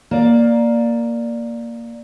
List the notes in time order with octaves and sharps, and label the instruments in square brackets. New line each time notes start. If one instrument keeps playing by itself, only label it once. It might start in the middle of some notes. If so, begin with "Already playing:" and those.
[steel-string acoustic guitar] A#3 D5